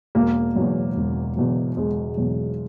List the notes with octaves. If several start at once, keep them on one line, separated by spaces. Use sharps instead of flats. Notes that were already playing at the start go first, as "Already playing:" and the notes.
E1 A#3
E2 B2 F#3
E1
E2 B2 F#3
E1 G#3
E2 B2 F#3